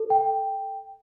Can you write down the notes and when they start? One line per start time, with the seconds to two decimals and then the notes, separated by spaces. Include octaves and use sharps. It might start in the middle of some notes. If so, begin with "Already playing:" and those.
Already playing: A4
0.10 G5